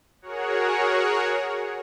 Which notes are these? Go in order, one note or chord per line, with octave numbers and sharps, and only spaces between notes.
F#4 G#4 A#4 C#5 F#5